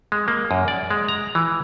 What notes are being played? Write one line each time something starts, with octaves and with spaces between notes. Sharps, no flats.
G#3
A#3
F#2
D5
G#3
A#5
E3